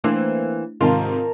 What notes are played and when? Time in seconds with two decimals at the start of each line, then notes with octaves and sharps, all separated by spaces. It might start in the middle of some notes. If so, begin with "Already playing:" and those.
0.04 E3 A3 A#3 C4 D4 E4
0.81 G#2 C3 D#3 F4 A#4 A5